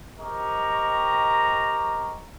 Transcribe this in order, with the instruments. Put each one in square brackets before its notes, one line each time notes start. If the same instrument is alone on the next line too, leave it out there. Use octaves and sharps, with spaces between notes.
[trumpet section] C4 G4 A#4 D#5 A#5 C#6